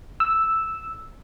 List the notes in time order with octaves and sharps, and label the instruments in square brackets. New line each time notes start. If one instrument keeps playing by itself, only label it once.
[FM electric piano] E6